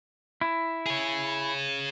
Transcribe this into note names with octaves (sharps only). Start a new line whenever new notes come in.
E4
G#4 C#5